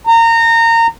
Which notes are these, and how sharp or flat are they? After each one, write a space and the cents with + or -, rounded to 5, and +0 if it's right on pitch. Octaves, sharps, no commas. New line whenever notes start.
A#5 -25